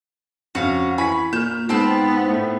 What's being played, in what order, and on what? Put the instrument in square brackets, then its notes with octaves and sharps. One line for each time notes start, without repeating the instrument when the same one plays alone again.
[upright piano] F2 C#3 C#4 [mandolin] F#4 F5
[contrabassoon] E3 [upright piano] G#5 C#6 B6 [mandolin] B5
[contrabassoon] A#2 [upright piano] F6 E7 [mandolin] G6
[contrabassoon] G#2 [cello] B3 [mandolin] C4 G5 A5
[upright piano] A2 A3